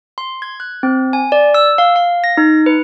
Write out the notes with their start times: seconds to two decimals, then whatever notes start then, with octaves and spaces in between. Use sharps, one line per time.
0.18 C6
0.42 G#6
0.60 F#6
0.83 C4
1.13 G#5
1.32 D5
1.54 E6
1.78 F5
1.96 F5
2.24 A#6
2.37 D#4
2.66 B4